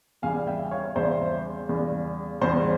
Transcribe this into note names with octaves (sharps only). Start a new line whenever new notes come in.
E2 C#3 G3 F5 G#5
E5 G5
C#5 F5
E2 C#3 G3 C5 E5
E2 C#3 G3
E2 C#3 G3 C5